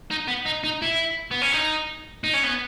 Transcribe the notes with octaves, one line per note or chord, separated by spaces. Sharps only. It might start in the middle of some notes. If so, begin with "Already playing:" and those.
D#4
B3
D#4
D#4
E4
B3
C#4
D#4
D#4
C#4
B3